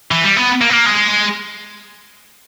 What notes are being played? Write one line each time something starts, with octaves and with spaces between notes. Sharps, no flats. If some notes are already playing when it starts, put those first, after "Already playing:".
E3
G3
B3
A#3
B3
A#3
G#3